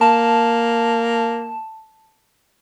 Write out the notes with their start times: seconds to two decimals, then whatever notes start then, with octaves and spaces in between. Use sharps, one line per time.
0.01 A#3 A5